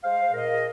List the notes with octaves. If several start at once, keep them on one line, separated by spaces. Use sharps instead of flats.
G#3 C5 F5
C5
A#2 A#4 D#5
G#4